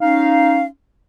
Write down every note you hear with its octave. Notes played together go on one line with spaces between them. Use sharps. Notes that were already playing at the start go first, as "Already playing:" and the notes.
C#4 D#4 F5